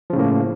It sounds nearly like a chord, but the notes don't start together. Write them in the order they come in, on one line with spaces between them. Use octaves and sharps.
F3 C#3 A2 A#3